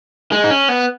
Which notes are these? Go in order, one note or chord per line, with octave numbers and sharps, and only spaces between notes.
G#3
D#4
C#4
B3